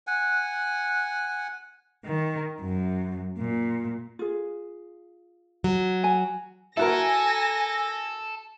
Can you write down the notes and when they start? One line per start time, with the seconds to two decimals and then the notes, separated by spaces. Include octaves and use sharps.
0.07 F#5 G#5
2.04 D#3
2.60 F#2
3.38 A#2
4.19 F4 G#4
5.64 F#3
6.04 G#5
6.77 E4 F#4 A4 A#4 G#5 A#6